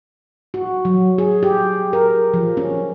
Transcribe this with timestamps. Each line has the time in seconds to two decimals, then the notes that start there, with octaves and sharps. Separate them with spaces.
0.54 F#4
0.85 F#3
1.18 G#4
1.43 G4
1.93 A#4
2.34 F3
2.57 C#4